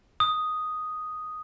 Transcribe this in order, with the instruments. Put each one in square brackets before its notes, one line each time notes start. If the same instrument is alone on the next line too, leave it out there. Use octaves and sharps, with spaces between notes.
[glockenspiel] D#6